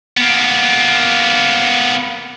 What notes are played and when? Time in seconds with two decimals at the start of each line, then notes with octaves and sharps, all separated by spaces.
0.17 A#3 B3